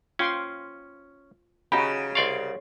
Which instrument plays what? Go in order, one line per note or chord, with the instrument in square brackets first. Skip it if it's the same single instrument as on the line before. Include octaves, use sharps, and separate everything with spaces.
[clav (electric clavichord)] C#4 [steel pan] F4 G5 C6
[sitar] C#3 [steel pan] C#4 F#4 D#5 [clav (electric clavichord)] D#4 G4 [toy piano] A#5 B5
[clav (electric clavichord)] C2 D5 F5 [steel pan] C6 C#6